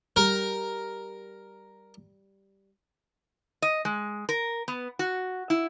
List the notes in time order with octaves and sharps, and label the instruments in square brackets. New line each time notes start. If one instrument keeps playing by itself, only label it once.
[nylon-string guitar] G3 [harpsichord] A#4
[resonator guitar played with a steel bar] D#5
G#3
A#4
B3
F#4
E4